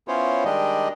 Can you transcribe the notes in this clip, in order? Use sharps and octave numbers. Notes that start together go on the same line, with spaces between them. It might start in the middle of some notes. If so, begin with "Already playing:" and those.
B3 C#4 E4 F4 C5 C#5
D#3 G3 G#3 D4 G4 D#5